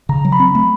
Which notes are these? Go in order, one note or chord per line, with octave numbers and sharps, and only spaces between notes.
C#3 A#5
F#3
B5
C4
A3 B5